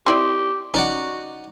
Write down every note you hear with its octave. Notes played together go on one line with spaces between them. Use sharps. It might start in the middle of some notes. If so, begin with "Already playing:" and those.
C4 E4 G4 D5 D#5 G5 C6
C#4 D#4 F#4 D5 F#5